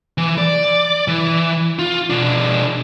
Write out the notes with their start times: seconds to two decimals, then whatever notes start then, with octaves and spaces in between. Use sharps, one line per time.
0.18 E3
0.38 D5
1.08 E3
1.79 F4
2.10 B2 D4